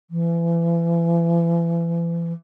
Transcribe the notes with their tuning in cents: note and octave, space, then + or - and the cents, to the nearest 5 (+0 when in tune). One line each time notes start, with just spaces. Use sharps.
E3 +35